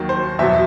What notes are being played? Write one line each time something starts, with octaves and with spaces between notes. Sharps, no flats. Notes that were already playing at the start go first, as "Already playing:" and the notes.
Already playing: D#2 D#3 F#3
C5
E2 B2 F#3 E5